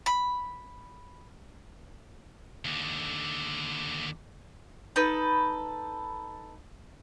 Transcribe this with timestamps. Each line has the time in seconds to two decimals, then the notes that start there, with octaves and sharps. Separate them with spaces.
0.06 B5
2.65 D#2 D3
4.96 D#4 A4 B4